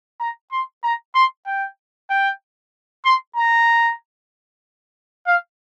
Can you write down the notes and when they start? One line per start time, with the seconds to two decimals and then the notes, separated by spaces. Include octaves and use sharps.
0.20 A#5
0.52 C6
0.84 A#5
1.15 C6
1.47 G5
2.10 G5
3.05 C6
3.36 A#5
5.27 F5